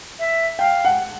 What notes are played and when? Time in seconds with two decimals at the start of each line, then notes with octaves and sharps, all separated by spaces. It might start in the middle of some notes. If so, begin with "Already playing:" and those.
0.19 E5
0.59 F5 G5
0.85 F#5